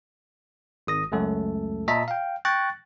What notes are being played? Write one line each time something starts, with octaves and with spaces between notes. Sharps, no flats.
G#1 D#6 A#6
C#2 F#2 A3 A4
A#2 D#5 E5 A5 A#5 B6
F5 G5
G5 C#6 F#6 A6 A#6